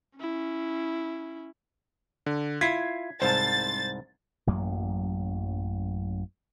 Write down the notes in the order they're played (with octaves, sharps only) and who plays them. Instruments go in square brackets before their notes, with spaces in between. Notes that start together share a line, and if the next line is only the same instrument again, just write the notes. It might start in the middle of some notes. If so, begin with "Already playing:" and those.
[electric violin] C#4 E4
[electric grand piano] D3
[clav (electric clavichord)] E4 F4 [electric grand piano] G#6 B6 C7
[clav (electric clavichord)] C2 G#2 A5 [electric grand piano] C5 [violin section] A6
[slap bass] A1 F#2 F#3 A#3